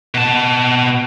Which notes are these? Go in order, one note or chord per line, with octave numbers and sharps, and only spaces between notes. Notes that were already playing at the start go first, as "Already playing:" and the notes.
B2 A5